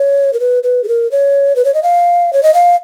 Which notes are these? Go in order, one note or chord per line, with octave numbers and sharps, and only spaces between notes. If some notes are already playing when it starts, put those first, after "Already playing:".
Already playing: C#5
A#4
B4
B4
G#4
A#4
C#5
B4
C#5
D#5
F5
C#5
D#5
F5